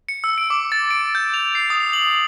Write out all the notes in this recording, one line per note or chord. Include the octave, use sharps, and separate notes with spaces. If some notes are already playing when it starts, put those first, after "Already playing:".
C#7
E6
D7
D6
A6
D7
G6
F7
C7
D#6
F#7